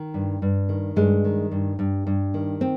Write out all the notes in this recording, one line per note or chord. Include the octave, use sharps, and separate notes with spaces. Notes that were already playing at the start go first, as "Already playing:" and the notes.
Already playing: D#3
G2
G2
D#3
G2 G#3
D#3
G2
G2
G2
D#3
C4